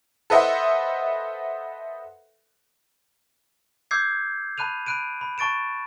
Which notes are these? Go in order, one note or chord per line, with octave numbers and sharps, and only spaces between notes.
A4 B4 C5 D#5 E5 F#5
D6 E6 G6 G#6 C7
A5 B5 F#6 D#7 F7
B5 F#6 D7 D#7
B5
A5 C#6 A6 D7 E7